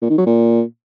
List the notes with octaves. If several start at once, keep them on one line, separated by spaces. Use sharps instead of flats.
A#2
D#3
F#3
A#2